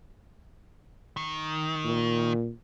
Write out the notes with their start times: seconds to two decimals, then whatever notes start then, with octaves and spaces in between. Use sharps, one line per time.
1.17 D#3
1.84 A#2